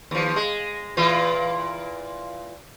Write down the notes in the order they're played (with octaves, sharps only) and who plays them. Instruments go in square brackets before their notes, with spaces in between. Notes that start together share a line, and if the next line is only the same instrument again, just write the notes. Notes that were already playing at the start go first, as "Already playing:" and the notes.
[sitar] D#2 F3
G#3
A#2 E3 F4